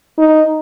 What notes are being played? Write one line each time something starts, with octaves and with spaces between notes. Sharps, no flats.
D#4